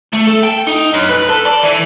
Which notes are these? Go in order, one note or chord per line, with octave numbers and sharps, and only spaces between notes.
A3
A4
G5
D#4
F#2
B4
A4
D5
E3